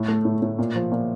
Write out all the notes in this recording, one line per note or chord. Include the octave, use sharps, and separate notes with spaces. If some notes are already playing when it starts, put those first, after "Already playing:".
Already playing: A2
A3
A2
A2
A#2
F3
A#2